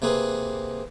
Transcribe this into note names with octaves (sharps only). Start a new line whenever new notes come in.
C3 A#3 C4 G#4 B4